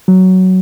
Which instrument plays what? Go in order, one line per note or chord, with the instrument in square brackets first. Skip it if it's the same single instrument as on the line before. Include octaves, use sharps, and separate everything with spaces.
[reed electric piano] F#3